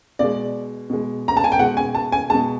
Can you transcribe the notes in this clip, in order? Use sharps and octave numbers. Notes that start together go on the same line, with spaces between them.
B2 G#3 D5
B2 G#3
A#5
A5
G#5
G5
B2 G#3 F#5
G#5
A5
G#5
B2 G#3 A5